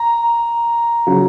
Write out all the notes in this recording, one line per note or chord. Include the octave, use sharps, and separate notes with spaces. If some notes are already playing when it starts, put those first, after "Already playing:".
Already playing: A#5
C#3 F#3